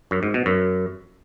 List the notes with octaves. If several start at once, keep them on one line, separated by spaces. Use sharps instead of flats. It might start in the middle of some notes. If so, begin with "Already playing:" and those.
F#2
G#2
B2
F#2